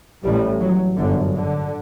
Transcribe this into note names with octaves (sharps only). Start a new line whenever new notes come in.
A1 A2 G3
F#3
G1 F#2 D3
D3